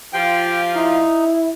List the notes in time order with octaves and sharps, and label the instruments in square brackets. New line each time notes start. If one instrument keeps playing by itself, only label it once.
[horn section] F3 F4 G4 [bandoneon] G5
[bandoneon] D#4 [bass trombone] E4